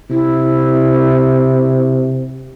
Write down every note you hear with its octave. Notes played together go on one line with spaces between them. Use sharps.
C3 E4